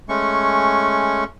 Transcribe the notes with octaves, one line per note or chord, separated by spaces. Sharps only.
G#3 A3 C#4 C#6